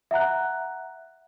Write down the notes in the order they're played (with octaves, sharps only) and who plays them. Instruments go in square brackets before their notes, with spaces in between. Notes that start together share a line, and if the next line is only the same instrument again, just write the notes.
[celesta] E5 F#5 A#5 F#6